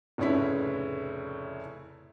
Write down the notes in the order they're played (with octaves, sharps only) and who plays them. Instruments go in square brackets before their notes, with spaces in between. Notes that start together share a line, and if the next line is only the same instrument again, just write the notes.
[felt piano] F1 A2 C#3 C#4 E4 B6